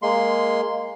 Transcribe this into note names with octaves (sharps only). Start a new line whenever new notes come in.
G#3 A#3 C6